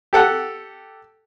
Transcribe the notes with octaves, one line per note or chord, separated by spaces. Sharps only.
G4 A4 F#5